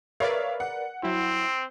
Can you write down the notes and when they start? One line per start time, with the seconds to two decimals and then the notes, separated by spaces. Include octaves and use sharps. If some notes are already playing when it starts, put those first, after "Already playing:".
0.20 A#4 B4 C#5 D5 E5 F5
0.60 F#5
1.03 F#3 C4 E4